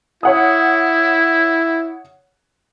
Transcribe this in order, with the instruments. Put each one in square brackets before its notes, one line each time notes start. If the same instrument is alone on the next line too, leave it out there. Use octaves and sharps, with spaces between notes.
[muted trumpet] E4 [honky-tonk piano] C#5 F#5 D#6